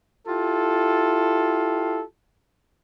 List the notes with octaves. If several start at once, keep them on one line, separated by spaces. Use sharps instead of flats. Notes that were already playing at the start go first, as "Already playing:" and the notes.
E4 F4 G4 A4